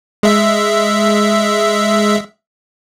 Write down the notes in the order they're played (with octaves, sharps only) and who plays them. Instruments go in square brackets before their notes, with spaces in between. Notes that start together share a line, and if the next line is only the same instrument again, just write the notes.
[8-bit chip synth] G#3 E5